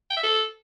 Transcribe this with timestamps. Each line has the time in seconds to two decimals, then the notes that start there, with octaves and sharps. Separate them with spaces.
0.10 G5
0.17 E5
0.24 A4